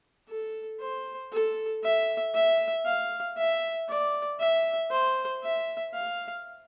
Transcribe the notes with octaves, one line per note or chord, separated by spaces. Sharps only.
A4
C5
A4
E5
E5
F5
E5
D5
E5
C5
E5
F5